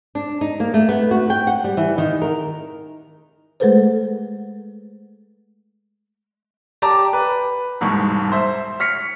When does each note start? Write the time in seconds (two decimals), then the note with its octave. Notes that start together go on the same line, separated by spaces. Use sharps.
0.15 D4
0.41 D#4
0.60 A#3
0.74 A3
0.89 B3
1.11 F#4
1.30 G5
1.47 F#5
1.64 G3
1.77 E3
1.98 D#3
2.22 A#4
3.60 G#3 A3 G#4 A4 B4 C5
6.82 G4 D5 A5 A#5 D6
7.13 B4
7.81 E1 C2 G#2 C#6
8.32 C5 E5
8.80 F6 B6 C#7